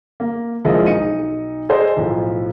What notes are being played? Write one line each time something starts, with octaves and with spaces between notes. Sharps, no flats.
A#3
A#1 F3 G#3 E4 A#4 D#5
B1 D#4 C#7 D#7
G#4 A4 C5 D5 D#5 G#5
B1 A2 F3